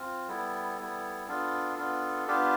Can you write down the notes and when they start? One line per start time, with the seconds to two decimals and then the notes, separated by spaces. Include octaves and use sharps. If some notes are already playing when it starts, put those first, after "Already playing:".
Already playing: C4 F4
0.28 G3 B3 E4 A4
0.78 G3 B3 E4
1.28 B3 D4 F4 A4
1.78 B3 D4 F4
2.28 B3 D4 F4 G4